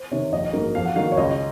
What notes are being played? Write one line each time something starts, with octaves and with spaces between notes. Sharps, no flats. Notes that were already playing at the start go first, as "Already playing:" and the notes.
Already playing: C5
C3 D#3 C#5
A#1 D#5
G#2 F#3 A#3
F2 F5
F#5
D#3 F#3 A#3 D#4 F5
C#5
C#2 D#5